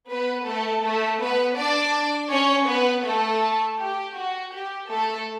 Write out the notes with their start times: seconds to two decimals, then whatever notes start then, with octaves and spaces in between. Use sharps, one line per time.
0.10 B3 B4
0.47 A3 A4
0.84 A3 A4
1.21 B3 B4
1.58 D4 D5
2.32 C#4 C#5
2.69 B3 B4
3.06 A3 A4
3.80 G4
4.17 F#4
4.54 G4
4.90 A3 A4